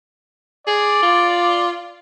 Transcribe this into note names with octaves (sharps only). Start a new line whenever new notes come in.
G#4 D5
F4